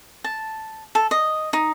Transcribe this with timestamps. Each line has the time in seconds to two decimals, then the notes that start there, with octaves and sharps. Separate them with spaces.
0.24 A5
0.95 A4
1.11 D#5
1.53 D#4